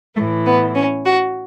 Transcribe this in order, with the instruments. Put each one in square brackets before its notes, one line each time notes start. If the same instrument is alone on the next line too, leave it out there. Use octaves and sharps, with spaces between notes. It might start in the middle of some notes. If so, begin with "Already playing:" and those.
[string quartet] A2 E3 A3
B3
C#4
F#4